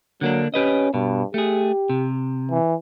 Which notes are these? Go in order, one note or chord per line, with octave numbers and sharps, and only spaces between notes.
D3 F#3 A#3 D4
C#4 G4 B4 D#5
G2 B2
A3 G4 G#4
C3
E3